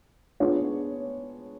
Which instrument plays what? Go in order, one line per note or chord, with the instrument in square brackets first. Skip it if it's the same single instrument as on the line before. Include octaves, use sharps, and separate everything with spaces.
[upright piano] B3 D4 F4 G#4 C#5